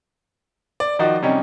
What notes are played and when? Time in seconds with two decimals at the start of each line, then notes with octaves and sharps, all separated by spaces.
0.80 D5
0.99 D#3 F3 D#4 F#4 D5
1.22 C3 G3 C#4 D#4